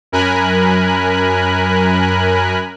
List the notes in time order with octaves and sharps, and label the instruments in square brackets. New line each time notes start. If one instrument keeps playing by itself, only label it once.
[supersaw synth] F#2 A#4 G#5 B5 F#6